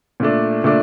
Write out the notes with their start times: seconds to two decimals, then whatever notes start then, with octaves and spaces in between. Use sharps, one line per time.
0.20 A#2 A3 D4
0.64 A#2 A3 D4